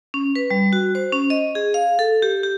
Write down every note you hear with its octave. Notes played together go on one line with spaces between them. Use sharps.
C#4
B4
G3
F#4
C5
C#4
D#5
G#4
F5
A4
G4
G4